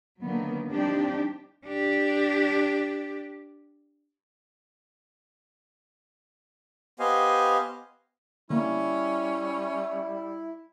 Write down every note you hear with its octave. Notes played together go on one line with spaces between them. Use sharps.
D3 D#3 F#3 A#3 B3
F3 G3 C4 D4 D#4 G4
D4 G4
B3 G4 C5 D#5 F5 G#5
D3 G3 A#3 C#4 E4